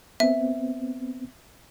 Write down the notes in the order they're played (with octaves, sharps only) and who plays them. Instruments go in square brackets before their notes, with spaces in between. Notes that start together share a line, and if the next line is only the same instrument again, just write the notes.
[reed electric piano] B3 C4 [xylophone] E5